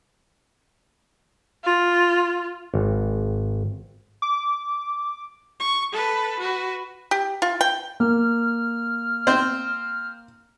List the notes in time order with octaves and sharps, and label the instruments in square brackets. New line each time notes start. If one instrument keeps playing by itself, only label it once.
[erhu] F4
[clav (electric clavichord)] G#1
[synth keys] D6
[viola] C#6
A4 B4
F#4 B4
[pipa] G4
F4
G5
[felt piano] A#3 [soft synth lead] F6
[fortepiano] C4 C5